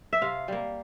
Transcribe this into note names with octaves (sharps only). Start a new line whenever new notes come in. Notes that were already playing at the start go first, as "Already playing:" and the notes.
E5
C3 F5
G3 A#3